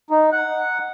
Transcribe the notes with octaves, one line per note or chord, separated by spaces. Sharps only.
D#4
F#5